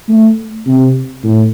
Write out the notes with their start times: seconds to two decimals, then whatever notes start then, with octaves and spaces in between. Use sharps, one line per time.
0.09 A3
0.66 C3
1.24 A2